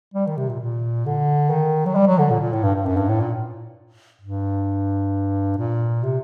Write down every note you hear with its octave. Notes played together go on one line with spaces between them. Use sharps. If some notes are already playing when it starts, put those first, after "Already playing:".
G3
D#3
C3
A#2
A#2
D3
D#3
F#3
G3
F#3
D3
A#2
A#2
A2
G2
G2
F#2
G2
A2
A#2
G2
A#2
C3